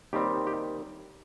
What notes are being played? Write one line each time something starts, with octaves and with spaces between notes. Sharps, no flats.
D#2 D#3 G3 C4 G4
G4